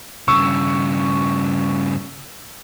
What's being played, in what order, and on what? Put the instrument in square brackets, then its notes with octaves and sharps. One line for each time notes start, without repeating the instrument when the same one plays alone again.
[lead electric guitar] G2 C#3 [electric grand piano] C#6 E6